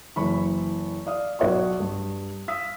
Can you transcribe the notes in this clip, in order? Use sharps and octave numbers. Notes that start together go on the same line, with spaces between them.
F#1 E3 B5 C#6
D5 F5 D#6
B1 F#4 C#5 D5 C#6
G2
F5 D#6 E6 B6